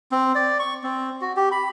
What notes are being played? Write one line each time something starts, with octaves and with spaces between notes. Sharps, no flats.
C4
D5
C#6
C4
F#4
G4
B5